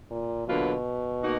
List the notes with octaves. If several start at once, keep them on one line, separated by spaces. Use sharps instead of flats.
A#2
B2 D3 F#3 A#3 F4 B4
A#3 D#4 F#4